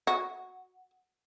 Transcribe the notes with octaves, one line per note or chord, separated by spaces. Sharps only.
F#4